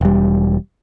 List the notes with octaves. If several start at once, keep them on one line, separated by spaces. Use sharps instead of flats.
E1 G3